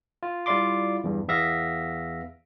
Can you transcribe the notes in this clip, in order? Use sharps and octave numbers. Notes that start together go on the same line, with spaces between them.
F4
G3 E4 F4 D5 C6 D6
E2 G2
E2 B3 E5 F5 A#6